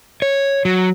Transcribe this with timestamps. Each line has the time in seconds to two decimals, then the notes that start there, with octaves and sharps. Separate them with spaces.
0.22 C#5
0.65 F#3